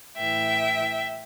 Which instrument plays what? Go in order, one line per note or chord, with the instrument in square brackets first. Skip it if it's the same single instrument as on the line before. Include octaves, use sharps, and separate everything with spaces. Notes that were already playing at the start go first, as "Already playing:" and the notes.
[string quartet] A2 E3 E5 G5